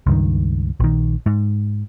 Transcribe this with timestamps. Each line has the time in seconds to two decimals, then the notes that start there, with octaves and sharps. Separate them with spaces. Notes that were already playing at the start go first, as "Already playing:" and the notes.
0.07 C#2 G2 D#3
0.80 A#1 D#3
1.26 G#2